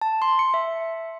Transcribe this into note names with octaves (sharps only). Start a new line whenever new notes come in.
A5
C6
C#7
E5